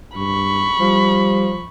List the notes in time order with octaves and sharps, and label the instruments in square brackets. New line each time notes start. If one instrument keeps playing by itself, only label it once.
[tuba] G2 [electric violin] B5 C#6
[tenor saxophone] F3 [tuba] G3